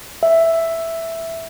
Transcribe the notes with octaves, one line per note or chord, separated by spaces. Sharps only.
E5